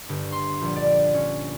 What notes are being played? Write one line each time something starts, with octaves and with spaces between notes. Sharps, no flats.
G1
C6
A#1
D5
C#4